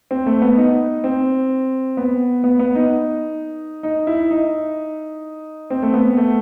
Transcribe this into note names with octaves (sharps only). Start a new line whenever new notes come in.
C4
A3
B3
D#4
C4
B3
B3
B3
D#4
D#4
E4
D#4
C4
A3
B3
A3